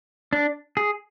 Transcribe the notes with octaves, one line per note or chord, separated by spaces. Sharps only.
D4
G#4